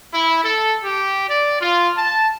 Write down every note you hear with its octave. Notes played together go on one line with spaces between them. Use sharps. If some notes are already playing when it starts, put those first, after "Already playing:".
E4
A4
G4
D5
F4
A5